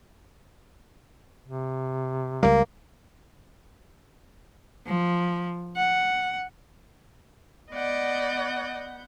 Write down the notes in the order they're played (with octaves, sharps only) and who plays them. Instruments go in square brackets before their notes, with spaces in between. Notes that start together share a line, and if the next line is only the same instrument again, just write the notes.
[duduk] C3
[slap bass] C#2 G3 [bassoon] A#3
[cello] F3
F#5
[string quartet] B3 F#5 G6 [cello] D5 D#5